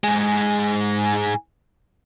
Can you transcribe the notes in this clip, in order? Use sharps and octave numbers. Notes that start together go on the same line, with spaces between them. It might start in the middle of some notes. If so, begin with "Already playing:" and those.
G#2 G#3